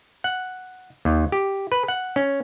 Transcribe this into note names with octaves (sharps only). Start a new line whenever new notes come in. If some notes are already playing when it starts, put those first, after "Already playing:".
F#5
D#2
G4
B4
F#5
C#4